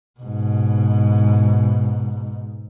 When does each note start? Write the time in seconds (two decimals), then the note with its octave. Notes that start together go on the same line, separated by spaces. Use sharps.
0.20 G#2 B2